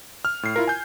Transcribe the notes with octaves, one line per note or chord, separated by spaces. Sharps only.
F6
A2 C7
E4 F4 A#4
G#5 G6